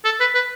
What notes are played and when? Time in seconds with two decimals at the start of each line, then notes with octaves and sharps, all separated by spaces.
0.05 A4
0.20 B4
0.34 B4